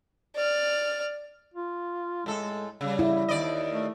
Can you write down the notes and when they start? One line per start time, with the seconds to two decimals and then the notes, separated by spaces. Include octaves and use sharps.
0.35 D5 F6
1.54 F4
2.26 A2 G#3 A4
2.81 C#3 G3
2.99 E4
3.29 D#2 D5 D#5
3.71 A3